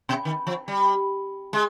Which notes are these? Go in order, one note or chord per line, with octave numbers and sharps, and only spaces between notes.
B2
D#3
F3
G3
G#3